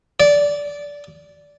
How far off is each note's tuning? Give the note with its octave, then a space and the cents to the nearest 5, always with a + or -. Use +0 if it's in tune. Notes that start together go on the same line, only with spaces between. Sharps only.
D5 -15